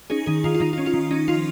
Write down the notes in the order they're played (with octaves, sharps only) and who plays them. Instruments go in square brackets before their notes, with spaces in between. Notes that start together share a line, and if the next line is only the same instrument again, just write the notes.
[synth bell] C#4 D#4 G#4
D#3 D#4 G#4
D#3 F4
F4
D#3 D#4
F4
C#4
F4
D#3
C#4 D#4
F3 F4